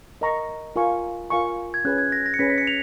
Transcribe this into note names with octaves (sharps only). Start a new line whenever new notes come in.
A#4 D#5 A#5 C#6
F4 A#4 F5 G#5 C#6
F4 A#4 F5 G#5 C#6
G#6
C#4 G#4 B4 F#6
G#6
A#6
A#6
C#7
C#4 G#4 B4 B6
B6
C#7
F7